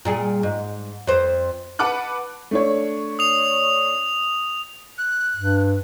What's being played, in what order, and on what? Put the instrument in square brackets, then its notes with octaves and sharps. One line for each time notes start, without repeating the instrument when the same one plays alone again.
[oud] A#2 G3 G#4
G#2
F2 C5
[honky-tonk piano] B4 F#5 A5 D6 F#6
[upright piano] A3 D4 C#5
[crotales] D#6 F7
[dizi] F#6
[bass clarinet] G2